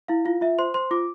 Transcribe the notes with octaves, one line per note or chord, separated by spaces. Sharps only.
E4 F5
F4 F5
F4 E5
C5 C6
C5 C6
F4 D6